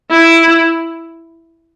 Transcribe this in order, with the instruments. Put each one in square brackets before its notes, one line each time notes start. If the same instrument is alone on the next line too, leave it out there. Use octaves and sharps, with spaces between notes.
[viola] E4